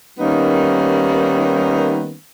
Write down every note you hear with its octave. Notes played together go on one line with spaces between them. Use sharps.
D#3 G3 A#3 B3 C#4 D#4